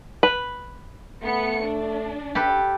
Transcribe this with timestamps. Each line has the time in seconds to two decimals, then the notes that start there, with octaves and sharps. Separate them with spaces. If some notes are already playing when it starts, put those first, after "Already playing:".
0.23 B4
1.23 A3 B3 C#7
1.62 D4
2.35 G4 A4 B4